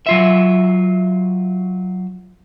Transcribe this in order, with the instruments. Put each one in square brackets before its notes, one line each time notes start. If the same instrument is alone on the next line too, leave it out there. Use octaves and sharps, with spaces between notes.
[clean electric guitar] F#3 F4 E5